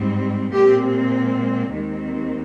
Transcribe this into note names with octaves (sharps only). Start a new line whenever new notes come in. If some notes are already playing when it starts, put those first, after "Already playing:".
Already playing: G#2 G3 C4
A#2 G#3 C4 G4
D#2 D#3 G#3 C4